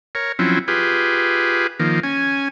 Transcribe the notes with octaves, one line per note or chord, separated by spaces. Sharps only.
A#4 C#5
F3 F#3 C4 C#4 E4
F4 G4 G#4 B4
D#3 F3 A#3
C#4 G#5